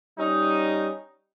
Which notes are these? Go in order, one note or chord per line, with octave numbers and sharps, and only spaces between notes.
G3 C#4 D#4